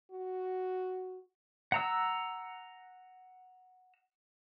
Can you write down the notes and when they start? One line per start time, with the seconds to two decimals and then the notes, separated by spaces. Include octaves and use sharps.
0.11 F#4
1.72 F#5 A#5 E6